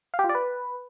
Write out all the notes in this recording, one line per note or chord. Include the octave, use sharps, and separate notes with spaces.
F5
G4
F4
D5
B4